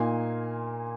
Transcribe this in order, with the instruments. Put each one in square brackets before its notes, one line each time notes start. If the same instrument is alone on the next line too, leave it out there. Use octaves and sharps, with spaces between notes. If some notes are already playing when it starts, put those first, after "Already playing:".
Already playing: [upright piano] A#2 A#3 D#4 G#5 C6